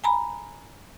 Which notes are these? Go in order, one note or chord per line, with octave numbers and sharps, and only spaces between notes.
G#5 A#5 B5